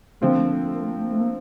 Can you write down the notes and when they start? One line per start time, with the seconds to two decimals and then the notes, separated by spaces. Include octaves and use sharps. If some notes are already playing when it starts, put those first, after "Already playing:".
0.21 D3 F3 A3 C4 F4
0.29 A#3
0.36 A3
0.44 A#3
0.52 A3
0.59 A#3
0.67 A3
0.75 A#3
0.82 A3
0.90 A#3
0.97 A3
1.05 A#3
1.12 A3
1.20 A#3